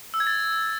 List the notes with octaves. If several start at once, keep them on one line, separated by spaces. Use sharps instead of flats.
E6
G#6
A6